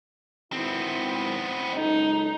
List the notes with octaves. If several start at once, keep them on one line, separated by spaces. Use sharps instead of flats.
G#1 B3 C4 E4
C#2 F#2 D#4 A4